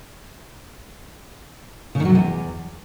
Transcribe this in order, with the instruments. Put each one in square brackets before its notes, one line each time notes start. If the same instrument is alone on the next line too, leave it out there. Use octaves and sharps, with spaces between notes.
[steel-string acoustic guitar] C#3
D#3
F#3
C3
E2